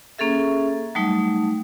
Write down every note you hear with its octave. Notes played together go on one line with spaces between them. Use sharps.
A#3 C#4 G#4 A4 E5
F#3 G3 A3 D#4